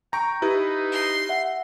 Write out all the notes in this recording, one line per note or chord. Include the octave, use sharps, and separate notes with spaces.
G5 A#5 C#6
D#4 E4 G4 B4
C6
E5 F#5